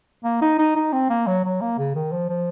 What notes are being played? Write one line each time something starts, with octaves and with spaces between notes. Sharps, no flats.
A#3
D#4
D#4
D#4
C4
A#3
F#3
F#3
A#3
C#3
D#3
F3
F3